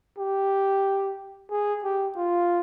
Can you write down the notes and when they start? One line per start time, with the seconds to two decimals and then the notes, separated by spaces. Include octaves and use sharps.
0.18 G4
1.51 G#4
1.84 G4
2.16 F4